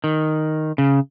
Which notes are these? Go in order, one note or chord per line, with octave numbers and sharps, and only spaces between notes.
D#3
C#3